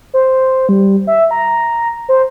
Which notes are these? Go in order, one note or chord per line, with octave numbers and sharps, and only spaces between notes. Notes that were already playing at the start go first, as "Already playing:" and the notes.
C5
G3
E5
A#5
C5